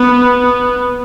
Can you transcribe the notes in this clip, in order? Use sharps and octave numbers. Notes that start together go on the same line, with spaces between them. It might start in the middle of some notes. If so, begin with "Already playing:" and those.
Already playing: B3